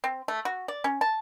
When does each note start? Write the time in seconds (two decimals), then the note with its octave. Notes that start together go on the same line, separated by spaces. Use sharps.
0.04 C4
0.28 A3
0.45 F#4
0.68 D5
0.84 C#4
1.01 A5